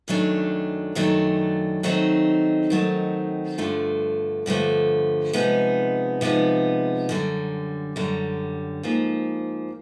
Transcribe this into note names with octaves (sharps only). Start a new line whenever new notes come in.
F#2 D#3 F#3 A3 D4
F#2 D#3 F#3 A3 D4
D#3 F#3 A3 C4 D#4
D#3 F#3 A3 C4 D#4
G2 D3 F3 A3
G2 D3 F3 A3
C3 F3 G#3 B3 D#4
C3 F3 G#3 B3 D#4
F#2 D3 G3
F#2 D3 G3
G#2 F3 A#3